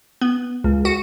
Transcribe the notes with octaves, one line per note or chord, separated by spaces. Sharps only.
B3
C#2
F#4